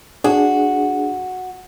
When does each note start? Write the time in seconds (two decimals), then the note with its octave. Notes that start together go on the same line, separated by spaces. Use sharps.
0.24 D4 F#4 G#4